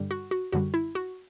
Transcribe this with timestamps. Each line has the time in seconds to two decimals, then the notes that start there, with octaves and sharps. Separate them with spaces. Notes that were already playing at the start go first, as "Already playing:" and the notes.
Already playing: G2 D3 G3
0.11 F#4
0.31 F#4
0.52 F#2 D3 G3 F#4
0.74 E4
0.95 F#4